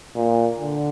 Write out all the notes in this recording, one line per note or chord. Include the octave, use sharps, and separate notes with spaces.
A#2
D3